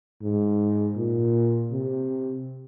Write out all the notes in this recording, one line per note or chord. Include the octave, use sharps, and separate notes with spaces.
G#2
A#2
C3